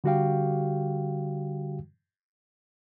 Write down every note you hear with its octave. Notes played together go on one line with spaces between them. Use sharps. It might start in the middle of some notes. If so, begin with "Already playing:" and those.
D3 G3 F#4 G4 F5 G5